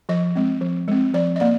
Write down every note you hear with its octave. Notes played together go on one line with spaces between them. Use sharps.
F3 D#5
G#3 C4
F3
G#3 C4
F3 D5
D#5
A#3 D5